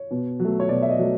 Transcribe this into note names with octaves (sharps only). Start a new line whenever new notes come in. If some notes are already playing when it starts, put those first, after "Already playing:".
Already playing: C#5
B2
F#3
A3
C#5
B2 D5
E5
D#5
F#3 A3